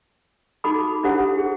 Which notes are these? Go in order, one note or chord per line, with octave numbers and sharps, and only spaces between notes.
D#4 F#4 A4 B5 D6
D4 E4 G4 A4 C5 F#5
G#4